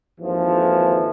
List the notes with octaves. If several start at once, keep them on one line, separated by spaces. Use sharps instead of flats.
G#1 D#2 E3 F3 A4